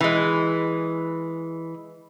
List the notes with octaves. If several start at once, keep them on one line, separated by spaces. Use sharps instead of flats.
E3 G#3